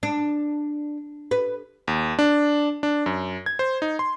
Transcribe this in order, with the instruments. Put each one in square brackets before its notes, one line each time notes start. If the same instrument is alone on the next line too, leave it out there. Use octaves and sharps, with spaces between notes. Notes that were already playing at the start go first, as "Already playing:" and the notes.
[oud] D4
B4
[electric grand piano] D#2
D4
D4
F#2
G#6
C5
D#4
C6